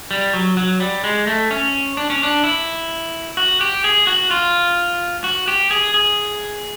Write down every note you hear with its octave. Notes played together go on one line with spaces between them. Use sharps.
G3
F#3
F#3
G3
G#3
A3
C#4
D4
C#4
D4
E4
F#4
G4
G#4
F#4
F4
F#4
G4
G#4
G#4